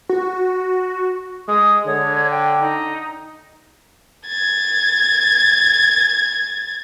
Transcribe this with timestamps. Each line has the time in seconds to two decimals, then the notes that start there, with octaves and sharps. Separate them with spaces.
0.09 F#4
1.48 G#3 D#6
1.86 D3 C#5
2.30 G5
2.60 D#4
4.27 G#6 A6